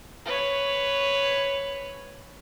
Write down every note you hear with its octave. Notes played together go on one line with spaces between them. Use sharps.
B4 C#5